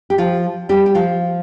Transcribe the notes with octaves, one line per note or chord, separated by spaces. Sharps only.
G4
F3 F4
G3 G4
G4
F3 F4